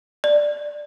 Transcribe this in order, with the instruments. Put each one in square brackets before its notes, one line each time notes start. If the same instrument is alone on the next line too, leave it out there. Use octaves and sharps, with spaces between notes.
[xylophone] D5